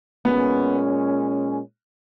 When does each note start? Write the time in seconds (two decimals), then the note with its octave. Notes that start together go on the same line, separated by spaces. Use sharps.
0.25 A#2 G#3 B3 C#4